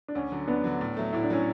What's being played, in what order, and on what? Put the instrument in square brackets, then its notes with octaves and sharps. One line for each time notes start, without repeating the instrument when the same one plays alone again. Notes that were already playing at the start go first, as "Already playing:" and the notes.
[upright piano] D4
[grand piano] D2 [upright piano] C#4
[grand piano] D3 F#3
[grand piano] D2 [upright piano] B3 D4
[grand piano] D3 F#3
A2
F#3 A3
[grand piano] A2 [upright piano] E4
[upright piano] D4
[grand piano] F#3 A3 [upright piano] C#4 E4